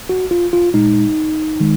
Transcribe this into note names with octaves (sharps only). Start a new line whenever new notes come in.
F#4
F4
F4
A#2 G#3 D#4
D#3 G#3